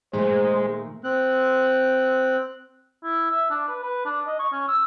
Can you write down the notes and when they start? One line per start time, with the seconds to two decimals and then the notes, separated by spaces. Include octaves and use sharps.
0.13 A#2 D#3 G#3 A3 G#4 C5
1.04 C4 F#6
3.04 E4
3.31 E5
3.50 D4
3.69 B4
3.83 B4
4.05 D4
4.27 D#5
4.39 C#6
4.52 C#4
4.68 E6